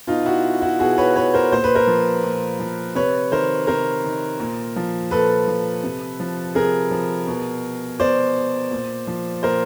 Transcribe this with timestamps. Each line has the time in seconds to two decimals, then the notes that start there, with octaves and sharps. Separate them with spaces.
0.07 B2 D#4 F4
0.25 E4 F#4
0.61 E4 F#4
0.79 B2 F#4 G#4
0.98 B4 C#5
1.16 B4 C#5
1.34 A#4 C5
1.52 A#2 C5
1.64 B4
1.75 A#4 C5
1.87 F3
2.23 A#2
2.60 F3
2.95 C3 B4 C#5
3.32 D#3 A#4 C5
3.67 C3 A#4 C5
4.04 D#3
4.40 A#2
4.76 F3
5.11 A#2 A4 B4
5.48 F3
5.83 C3
6.20 F3
6.55 C3 G#4 A#4
6.91 F3
7.27 B2
8.00 B2 C5 D5
8.71 A#2
9.07 F3
9.43 A#2 A#4 C5